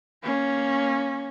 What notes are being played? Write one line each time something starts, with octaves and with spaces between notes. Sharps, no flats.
A#3 C#4